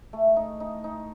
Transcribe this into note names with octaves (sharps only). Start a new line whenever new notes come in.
A3
D#4
D#4
D#4